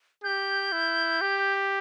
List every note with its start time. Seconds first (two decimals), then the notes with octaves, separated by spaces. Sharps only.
0.24 G4 G6
0.72 E4
1.21 G4